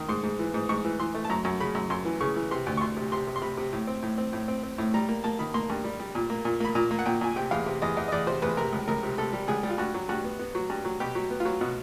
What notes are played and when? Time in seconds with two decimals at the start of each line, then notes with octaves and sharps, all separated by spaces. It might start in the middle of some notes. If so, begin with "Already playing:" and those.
Already playing: D#3
0.09 G#2 C6
0.23 G#2
0.39 E3
0.54 G#2
0.69 G#2 C#6
0.85 E3
0.99 E3 C6
1.15 A3
1.25 A5
1.30 F#2 A#5
1.45 F#2
1.60 C#3 B5
1.75 F#2
1.90 F#2 C6
2.05 E3
2.21 C#3 C#6
2.36 E3
2.51 C3 C6
2.66 D2
2.77 C#6
2.81 D2 C6
2.97 C3
3.12 C3 C6
3.27 C3
3.36 C6
3.42 C3 B5
3.57 C3
3.73 A2
3.87 C4
4.03 A2
4.18 C4
4.33 A2
4.48 C4
4.63 C4
4.78 A2
4.94 G3 A#5
5.09 A#3
5.24 A#3 A5
5.39 D#3 B5
5.54 A#3 C6
5.70 G2
5.84 G3
6.00 G3
6.15 A#2
6.30 A#3
6.45 A#2
6.60 A#3 B5
6.75 A#2 A#5
6.91 A#3
6.99 F#5
7.06 A#2 G5
7.21 A#2 G#5
7.36 C3 G5
7.51 E2 F5
7.66 C3
7.82 E2 D#5
7.97 E2 D#5
8.08 D#5
8.12 E2 D5
8.27 C3 C5
8.42 E2 B4
8.57 C3 A#4
8.72 C#2
8.88 C#2 A#4
9.03 C3
9.18 C3 A4
9.33 G3
9.48 C#2 G#4
9.63 G3
9.69 F4
9.78 G2 F#4
9.94 F#3
10.09 G2 F#4
10.24 B3
10.39 B3
10.55 F#3
10.70 G2
10.85 F#3
11.00 B2 G4
11.15 F#3
11.30 B3
11.40 F4
11.45 F#3
11.61 B2 F#4